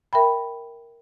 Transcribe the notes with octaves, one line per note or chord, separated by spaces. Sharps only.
A#4 E5 G5 B5